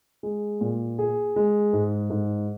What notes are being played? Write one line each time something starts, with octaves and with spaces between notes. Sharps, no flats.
G#3
A#2
G#4
G#3
G#2
G#2